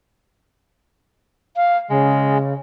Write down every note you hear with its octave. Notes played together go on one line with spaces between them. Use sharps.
F5
C#3 G#3